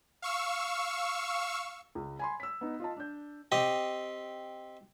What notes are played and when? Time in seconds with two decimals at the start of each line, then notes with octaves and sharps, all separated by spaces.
0.22 F5 C#6 E6
1.95 C#2
2.19 G#5 B5 C6
2.40 E6 B6
2.61 B3 D#4
2.80 F4 D#5 A5
2.97 D4 G6
3.52 C4 G4 D#5